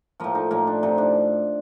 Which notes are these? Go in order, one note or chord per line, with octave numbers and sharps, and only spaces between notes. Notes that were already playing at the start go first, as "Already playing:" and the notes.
A2 F3 A#3
D#4
A2 F3 A#3
D4
C3 F3 D#4
D4